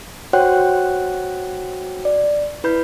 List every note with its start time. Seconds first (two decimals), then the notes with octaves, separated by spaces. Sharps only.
0.33 F#4 C5 C#5 F#5 G5 F#6
2.05 D5
2.64 E4 B4 B5 G6